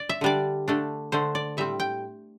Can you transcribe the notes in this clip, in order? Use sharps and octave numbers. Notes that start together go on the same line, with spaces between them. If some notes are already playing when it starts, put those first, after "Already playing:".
Already playing: D5
E5
D3 G3 D4 D5
D3 A3 D4
D3 A3 D4 C5
D5
A2 G3 C4 E5
G5